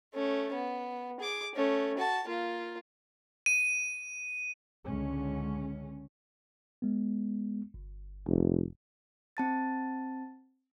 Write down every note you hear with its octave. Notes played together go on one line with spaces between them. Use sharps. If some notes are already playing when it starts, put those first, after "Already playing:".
A3 C#4
B3
G#4 D6
A3 C#4
F#4 A5
A#3 F4
D#7
C#2 D3 G#3 C#4
G#3 B3
G1
F1
C4 A5 A6